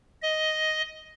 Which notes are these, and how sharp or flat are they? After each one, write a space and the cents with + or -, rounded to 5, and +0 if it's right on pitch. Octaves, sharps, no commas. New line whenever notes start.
D#5 +5